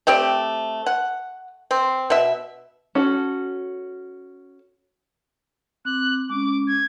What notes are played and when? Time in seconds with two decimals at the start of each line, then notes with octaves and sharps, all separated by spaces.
0.07 A3 C4 G4 D5
0.86 F#5
1.71 C4
2.10 B2 E5
2.95 C#4 F#4 A4
5.85 C4 D6 F#6
6.29 G#3 C#4 D6
6.67 G#6